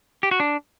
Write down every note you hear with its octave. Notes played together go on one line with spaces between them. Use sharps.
G4
F#4
D4